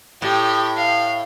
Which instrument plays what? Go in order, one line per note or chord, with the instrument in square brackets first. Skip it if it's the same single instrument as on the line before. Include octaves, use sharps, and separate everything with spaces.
[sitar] A2 [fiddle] G4
[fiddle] F5